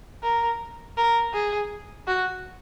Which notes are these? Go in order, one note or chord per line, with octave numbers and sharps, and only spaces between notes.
A#4
A#4
G#4
F#4